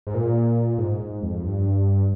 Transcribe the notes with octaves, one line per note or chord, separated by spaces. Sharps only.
G#2
A#2
G#2
G#2
F2
G2